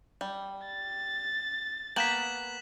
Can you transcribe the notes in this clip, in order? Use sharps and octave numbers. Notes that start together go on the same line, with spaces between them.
G3
A6
A#3 B3 G5 B6 E7 F#7